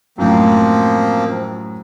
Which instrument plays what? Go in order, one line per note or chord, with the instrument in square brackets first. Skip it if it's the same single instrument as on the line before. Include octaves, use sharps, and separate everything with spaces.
[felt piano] F#2 A2 [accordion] F3 A#3 C4